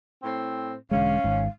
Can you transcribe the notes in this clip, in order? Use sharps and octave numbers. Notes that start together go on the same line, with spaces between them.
A2 C4
E1 D3 G#3 C#4 F5
G#1 G#2